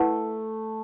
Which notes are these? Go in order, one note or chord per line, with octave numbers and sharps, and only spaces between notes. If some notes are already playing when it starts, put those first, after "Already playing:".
Already playing: A3 E4 B4 F#5 A5